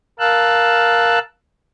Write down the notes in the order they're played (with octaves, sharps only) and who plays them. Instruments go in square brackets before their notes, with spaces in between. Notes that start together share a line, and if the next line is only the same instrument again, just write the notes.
[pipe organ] A#4 F5 A5 E6 F#6